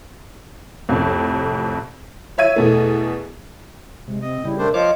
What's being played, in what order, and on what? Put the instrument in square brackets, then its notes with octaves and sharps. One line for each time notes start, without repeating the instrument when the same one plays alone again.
[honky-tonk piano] C2 F2 A2
C#5 E5 G#6 D#7
E2 B2 A3
[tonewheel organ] C3 [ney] G#3
[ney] C4 [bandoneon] D#5
[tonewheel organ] C#3 G3 [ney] E4
[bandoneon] A3 D4 C5 [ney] A#4
[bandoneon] F3 F4 [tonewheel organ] C5 C#5 D6 [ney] D#5